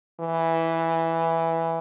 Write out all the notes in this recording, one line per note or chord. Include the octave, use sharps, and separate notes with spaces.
E3